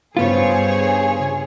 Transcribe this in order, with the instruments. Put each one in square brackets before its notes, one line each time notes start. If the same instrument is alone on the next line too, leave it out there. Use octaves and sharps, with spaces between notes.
[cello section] G2 C#5 [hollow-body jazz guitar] C#3 B3 F4 [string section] G#4 [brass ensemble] C5